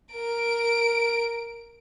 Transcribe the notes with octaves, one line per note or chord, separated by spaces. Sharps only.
A#4 D7